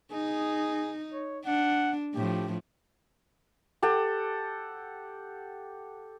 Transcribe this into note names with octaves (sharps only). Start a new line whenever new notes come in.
D#4 G#4
C#5
D4 F#5
A2 F3 G4
G4 A4 F#5